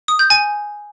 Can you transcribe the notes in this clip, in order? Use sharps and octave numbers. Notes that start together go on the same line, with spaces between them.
D#6
G6
G#5